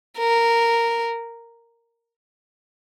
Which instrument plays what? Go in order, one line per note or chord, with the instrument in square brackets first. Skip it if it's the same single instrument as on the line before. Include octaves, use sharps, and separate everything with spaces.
[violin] A#4